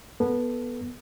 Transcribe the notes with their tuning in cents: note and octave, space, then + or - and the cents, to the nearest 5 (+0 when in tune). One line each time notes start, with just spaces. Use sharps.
B3 -15 A4 +0